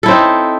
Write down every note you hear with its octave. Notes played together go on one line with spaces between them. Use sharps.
C4 D#4 E4 A4